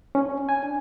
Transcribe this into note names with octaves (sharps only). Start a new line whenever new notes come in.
C#4
G#5
D4